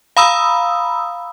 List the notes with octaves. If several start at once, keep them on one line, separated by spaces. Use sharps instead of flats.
F5 A#5 B5 D#6 E6